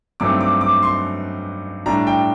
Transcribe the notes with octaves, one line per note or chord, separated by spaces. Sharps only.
G2 F#3 A3 C4 D#4 D6
D6
D6
C6
A2 G3 D4 A#5
G5